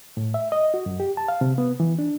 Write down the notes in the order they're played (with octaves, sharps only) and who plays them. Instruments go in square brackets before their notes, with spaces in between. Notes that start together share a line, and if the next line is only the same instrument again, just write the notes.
[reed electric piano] A2
E5
D#5
F#4
F#2
G4
A5
F5
C3
B3
E3
D4